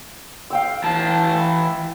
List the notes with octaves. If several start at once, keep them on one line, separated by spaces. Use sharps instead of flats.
F5 G5 E6
E3 A5